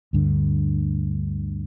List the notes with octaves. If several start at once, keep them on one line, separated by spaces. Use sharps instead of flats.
D2 G2 D3